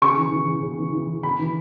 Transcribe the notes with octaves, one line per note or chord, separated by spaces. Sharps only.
C#3 C#6
E3
E3
C#3
C#3
E3
E3
C#3
C#3 B5
E3